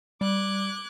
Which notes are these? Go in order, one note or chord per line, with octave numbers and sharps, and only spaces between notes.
G3 D6 F#6 G#6